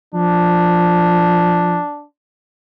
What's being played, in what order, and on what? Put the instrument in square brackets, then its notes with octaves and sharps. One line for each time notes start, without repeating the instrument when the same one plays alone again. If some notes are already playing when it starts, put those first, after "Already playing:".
[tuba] F3 [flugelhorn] D4